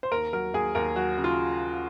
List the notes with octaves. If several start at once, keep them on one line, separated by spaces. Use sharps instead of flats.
C5
D#2 A#4
F#3 A#4
D#2 G#4
D#2 A#4
F#3 F#4
C#3
F4